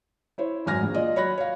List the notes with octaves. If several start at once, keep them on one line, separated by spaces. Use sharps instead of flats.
E4 C5 C#5
G#1 F#2 G#5 F6 A#6
A#1
F4 D5 D#5
F#3 C#5 B5 F#6 A#6
C#5 F5